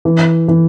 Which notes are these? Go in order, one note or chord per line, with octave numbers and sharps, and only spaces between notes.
E3
E3